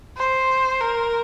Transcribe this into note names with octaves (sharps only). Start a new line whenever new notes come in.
C5
A#4